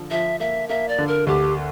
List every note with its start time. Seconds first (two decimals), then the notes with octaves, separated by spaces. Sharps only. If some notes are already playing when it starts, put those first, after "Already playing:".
Already playing: D3 F3
0.11 F3 E5
0.40 A#3 E5
0.69 A#3 E5
0.89 D5
0.98 D3
1.07 A#4
1.27 D2 G4